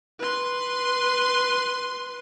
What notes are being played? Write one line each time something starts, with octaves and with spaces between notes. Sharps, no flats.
B4 C6